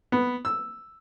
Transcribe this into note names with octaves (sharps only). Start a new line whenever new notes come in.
B3
E6